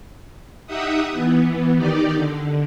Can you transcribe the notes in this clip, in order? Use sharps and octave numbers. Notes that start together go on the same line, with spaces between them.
D#4 G4 E5 F#5 D#6
E3 B3
D#3 D#4 G4 D5
D3